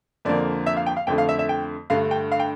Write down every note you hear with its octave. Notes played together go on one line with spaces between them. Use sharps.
F2 D3 F3 A#3 D5
E5
F5
G5
F5
F2 D3 A3 G5
F5
E5
E5
G5
G2 D3 A3 F5
G5
F5
G5